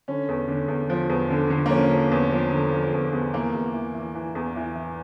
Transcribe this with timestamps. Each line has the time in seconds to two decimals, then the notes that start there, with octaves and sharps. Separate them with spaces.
0.08 D3 C#4
0.29 E2
0.48 D3
0.68 E2
0.90 F3
1.10 E2
1.30 D3
1.50 D3
1.66 A#3
1.70 F3 C#4
1.90 F3
2.12 E2
2.32 F3
2.52 D3
2.72 F3
2.93 E2
3.13 E2
3.34 E3 A#3
3.54 E2
3.74 E3
3.94 E3
4.15 E3
4.35 E2
4.56 E3
4.75 E3